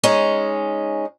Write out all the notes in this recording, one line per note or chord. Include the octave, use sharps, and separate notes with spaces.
G#3 C#4 D#4